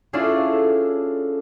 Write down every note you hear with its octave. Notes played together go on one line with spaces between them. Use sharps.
C#4 D4 E4 F4 G#4 A4